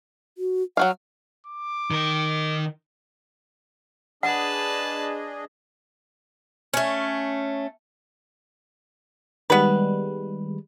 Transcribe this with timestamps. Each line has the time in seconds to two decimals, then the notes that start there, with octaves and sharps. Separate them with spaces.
0.38 F#4
0.77 F#3 F#4 F5 F#5
1.47 D6
1.91 D#3 A#4
4.23 D4 G#4 B4 D#5 F#5 A5
6.74 A3 C#4
9.50 D#3 G3 G#3 B3 B4